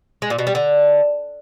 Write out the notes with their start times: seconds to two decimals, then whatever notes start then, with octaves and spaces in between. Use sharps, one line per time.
0.22 G#3
0.30 A#2
0.38 B2
0.47 G3
0.55 D3